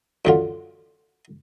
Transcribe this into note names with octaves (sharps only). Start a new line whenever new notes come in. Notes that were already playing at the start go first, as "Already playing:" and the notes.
F#2 D3 F4